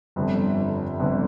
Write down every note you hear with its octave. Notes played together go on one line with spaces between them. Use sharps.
G1 F2 D3
G1 F2 D3